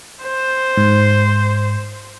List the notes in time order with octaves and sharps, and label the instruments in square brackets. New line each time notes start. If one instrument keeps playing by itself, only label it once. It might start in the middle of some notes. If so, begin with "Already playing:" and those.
[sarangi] C5
[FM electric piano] G#2